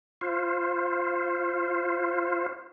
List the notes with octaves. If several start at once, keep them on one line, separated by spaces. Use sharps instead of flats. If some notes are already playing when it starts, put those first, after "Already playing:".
F4 C5